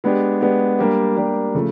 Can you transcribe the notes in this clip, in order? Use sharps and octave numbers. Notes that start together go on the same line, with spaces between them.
G#3 B3 D4 G4
G#3 B3 D4 G4
G3 A#3 D4 G4
G3 A#3 D4 G4
C#3 F3 A3